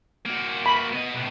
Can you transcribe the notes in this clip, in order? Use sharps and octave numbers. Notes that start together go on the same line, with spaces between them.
A#3 F#4
B5
B3 D#5
B1 A2